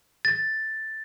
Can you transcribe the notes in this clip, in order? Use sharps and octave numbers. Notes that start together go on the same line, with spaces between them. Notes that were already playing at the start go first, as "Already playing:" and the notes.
A6